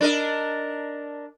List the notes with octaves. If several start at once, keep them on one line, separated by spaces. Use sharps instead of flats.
D4 A#4 D#5